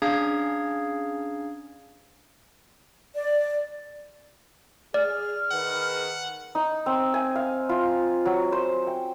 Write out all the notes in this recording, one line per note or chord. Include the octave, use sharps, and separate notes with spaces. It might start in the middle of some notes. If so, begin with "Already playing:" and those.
C#4 D4 G#4 F5 A#5 G#6
D5
G#4 D5 F6
D#3 G#4 B4 F#5
D#4
C4
G#5
F5
F4
F#3
C5
G5